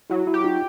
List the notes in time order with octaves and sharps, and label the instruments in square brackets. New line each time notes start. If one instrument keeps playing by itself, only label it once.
[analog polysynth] F#3 [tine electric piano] E4 F#4
[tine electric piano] E4 F#4
[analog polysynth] G4
[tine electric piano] F#4
D#4 F4